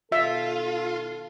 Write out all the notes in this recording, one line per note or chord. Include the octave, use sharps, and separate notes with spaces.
B2 D#3 F4 A4 E5